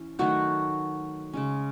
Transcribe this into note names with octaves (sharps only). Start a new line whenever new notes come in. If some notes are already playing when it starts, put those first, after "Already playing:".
Already playing: E3 C#4
D#3 F#3 A3 F#4
C#3 G#3 C#4